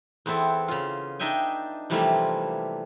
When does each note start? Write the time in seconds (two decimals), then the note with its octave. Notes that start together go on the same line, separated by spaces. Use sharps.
0.26 E2 B3 C4 E4 A4
0.68 C#3 F4
1.20 D4 D#4 D#5 E5 G5 G#5
1.90 C3 E3 F3 G3 A3 A#3